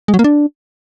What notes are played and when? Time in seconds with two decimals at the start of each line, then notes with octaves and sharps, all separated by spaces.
0.08 G#3
0.14 F#3
0.19 A#3
0.24 D4